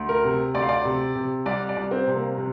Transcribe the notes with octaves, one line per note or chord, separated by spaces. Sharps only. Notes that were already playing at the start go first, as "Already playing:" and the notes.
Already playing: D2
A#4
C3
D2 D5
F5
D5
C3
C3
C2 D5
D5
C2
C4
C3
A#3
C3